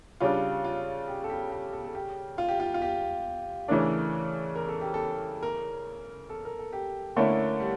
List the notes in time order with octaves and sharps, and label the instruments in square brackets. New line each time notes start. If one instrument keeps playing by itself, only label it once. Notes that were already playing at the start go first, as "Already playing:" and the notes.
[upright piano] C#3 G3 D4 [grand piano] F4
[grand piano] F4
G4
A4
G4
G4
A4
A4
G4
F4
G4
F4
F4
G4
[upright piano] C#3 E3 A3 D4 [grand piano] A#4
[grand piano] A#4
A4
G4
A4
A#4
A4
A#4
A4
G4
[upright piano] D3 A3 C#4 E4 [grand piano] A#3
[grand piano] G3